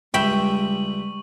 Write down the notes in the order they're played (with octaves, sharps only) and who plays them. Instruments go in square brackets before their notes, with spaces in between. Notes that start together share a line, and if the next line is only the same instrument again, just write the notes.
[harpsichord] C#2 [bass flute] G3 [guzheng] E5 G5 B5 [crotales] C#6 F#7